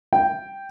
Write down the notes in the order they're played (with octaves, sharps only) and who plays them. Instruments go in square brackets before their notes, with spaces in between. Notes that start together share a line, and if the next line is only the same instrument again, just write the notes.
[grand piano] G5